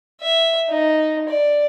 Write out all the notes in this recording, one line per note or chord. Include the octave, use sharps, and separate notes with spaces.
E5
D#4
D5